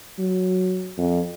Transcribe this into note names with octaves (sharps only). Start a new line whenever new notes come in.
F#3
F2